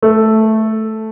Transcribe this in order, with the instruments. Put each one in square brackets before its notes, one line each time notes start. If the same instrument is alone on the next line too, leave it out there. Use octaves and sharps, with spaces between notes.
[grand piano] A3